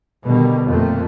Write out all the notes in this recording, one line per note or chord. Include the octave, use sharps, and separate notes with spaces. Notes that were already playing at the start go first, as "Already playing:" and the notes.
B2 D3 D#3 G3
F2 A#2 A3 A#3